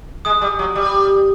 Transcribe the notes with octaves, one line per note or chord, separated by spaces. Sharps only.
G#3 D#6
G3
F#3
G3